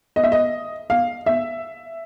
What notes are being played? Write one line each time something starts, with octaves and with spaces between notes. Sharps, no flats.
D#5
E5
D#5
F5
E5